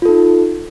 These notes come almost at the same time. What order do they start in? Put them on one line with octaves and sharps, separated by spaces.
F4 A4 D#4